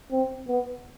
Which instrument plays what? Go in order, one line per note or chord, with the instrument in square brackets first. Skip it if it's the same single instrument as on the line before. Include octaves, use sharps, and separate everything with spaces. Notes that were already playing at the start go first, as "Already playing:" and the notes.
[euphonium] C4
B3